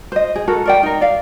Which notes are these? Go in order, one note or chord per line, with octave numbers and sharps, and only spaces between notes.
C5 D#5
G#4
F#4 A4 A#4
A#4 D5 G5
D#4 A#4
D5 F5